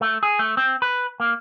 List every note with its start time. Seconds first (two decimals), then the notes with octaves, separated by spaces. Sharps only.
0.01 A3
0.23 G#4
0.39 A3
0.57 C4
0.82 B4
1.20 A#3